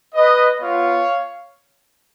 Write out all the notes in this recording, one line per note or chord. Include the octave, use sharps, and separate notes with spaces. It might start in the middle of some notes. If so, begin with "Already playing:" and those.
B4 D#5
B3 F4 C#5 F5